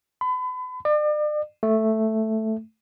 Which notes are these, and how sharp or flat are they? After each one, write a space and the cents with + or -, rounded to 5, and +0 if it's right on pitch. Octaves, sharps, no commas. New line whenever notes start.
B5 +35
D5 +40
A3 +0